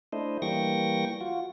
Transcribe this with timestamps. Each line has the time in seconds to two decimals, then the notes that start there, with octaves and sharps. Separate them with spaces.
0.13 A3 D4 E4 C5 D#5
0.42 E3 G3 A#3 G5 C#6 A#6
1.21 F4 F#4